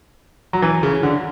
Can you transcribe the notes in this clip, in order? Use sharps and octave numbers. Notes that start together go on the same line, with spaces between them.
F#3
E3
C#3
D3